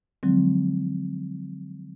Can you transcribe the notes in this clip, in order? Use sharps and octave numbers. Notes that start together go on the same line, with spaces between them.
D3 F3 F#3 G#3 C4